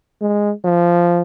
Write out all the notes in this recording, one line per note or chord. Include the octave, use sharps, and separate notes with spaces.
G#3
F3